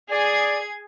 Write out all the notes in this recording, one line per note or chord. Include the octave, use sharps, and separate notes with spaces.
G#4 D5 G#6